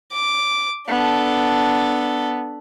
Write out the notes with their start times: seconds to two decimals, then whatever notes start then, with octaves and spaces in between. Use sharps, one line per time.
0.12 D6
0.88 B3 D4 A4